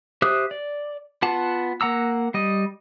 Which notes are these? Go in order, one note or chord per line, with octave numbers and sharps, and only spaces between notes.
G4 C5 E5 D#6 F#6
D5
B3 F4 F#5 A5
A#3 F#5 A#5 E6
G3 D#5